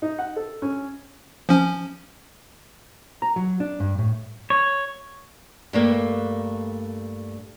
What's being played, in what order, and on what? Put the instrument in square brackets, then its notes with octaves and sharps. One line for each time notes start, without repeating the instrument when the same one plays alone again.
[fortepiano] D#4
F#5
A4
C#4
[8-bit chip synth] F3 C#4
[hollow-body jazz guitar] A#5
F#3
D4
G2
A2
[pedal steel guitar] C#5
[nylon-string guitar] G2 A3 A#3